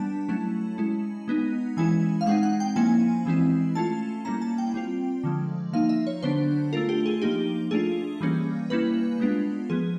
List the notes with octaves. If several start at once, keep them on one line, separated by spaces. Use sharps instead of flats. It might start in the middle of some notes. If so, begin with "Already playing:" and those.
Already playing: G3 B3 D4 A5
F#3 A3 C#4 E4
G#3 C#4 E4
G#3 B3 D#4
E3 G#3 C#4 E4 G#5
F5
G#3 C4 D#4 F#5
F#5
G5
F3 A#3 C#4 E4 G#5
E3 G#3 C4 E4
A3 C#4 F4 A5
G3 A#3 C#4 E4 A#5
A5
G5
G3 C4 F4
D3 F3 G#3
F3 A#3 D#4 F5
E5
C#5
D3 F#3 B3 D4 C5
A3 D4 F4 A#4
G4
G#4
F3 A#3 D#4 G4
A3 D4 F4 G#4
E3 G3 A#3 C#4
G3 A#3 C#4 E4 B4
G#3 B3 D4 F4
F3 G#3 B3 G#4